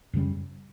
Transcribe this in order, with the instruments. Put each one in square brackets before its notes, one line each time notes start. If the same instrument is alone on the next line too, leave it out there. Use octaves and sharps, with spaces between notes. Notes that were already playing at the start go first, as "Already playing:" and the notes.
[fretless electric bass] F#2 C#3 G3 C#4